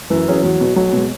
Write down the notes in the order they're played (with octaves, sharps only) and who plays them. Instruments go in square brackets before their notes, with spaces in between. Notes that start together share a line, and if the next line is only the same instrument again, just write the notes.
[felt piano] F#2 [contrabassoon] E3
[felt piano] F#3 C#4 G#4 C#5
[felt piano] E2 [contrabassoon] F#3
[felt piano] B2 B3
[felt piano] B1 [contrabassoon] F#3
[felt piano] B2 G#3